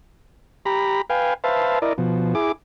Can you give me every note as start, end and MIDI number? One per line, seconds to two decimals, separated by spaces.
0.66 1.01 67
0.66 1.01 82
0.66 1.01 83
1.10 1.34 71
1.10 1.34 77
1.10 1.34 79
1.10 1.34 80
1.44 1.79 71
1.44 1.79 72
1.44 1.79 76
1.44 1.79 77
1.44 1.79 81
1.82 1.93 64
1.82 1.93 70
1.82 1.93 74
1.82 1.93 75
1.98 2.34 47
1.98 2.34 53
2.35 2.52 64
2.35 2.52 68
2.35 2.52 86